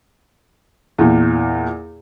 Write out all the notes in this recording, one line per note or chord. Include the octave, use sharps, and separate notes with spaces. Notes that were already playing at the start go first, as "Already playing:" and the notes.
E2 A#2